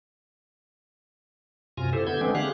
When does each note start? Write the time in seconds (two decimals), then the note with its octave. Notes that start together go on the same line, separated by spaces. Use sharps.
1.77 F#2 C3 F4 G#5 A#6
1.93 E4 G4 A4 C5
2.07 D3 B3 G6 G#6
2.21 D3 E3 G#3 B3 C4 D4
2.35 G4 G#4 F5 F#6